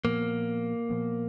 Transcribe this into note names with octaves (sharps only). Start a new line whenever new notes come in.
A#2 F3 A#3 B3
A#2 F3 B3